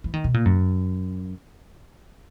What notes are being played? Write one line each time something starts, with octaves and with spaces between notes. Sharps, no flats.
E3
D#3
B2
A#2
F#2